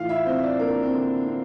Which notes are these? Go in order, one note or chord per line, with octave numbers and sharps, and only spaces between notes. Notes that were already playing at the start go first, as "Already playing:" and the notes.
Already playing: A2 E3 F4 F5
E4 E5
C4 C5
E5
D4 D5
A#3 A#4
C4
D3 D4
C4